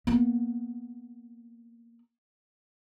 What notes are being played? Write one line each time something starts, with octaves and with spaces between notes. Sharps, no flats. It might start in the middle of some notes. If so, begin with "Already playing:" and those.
A#3 B3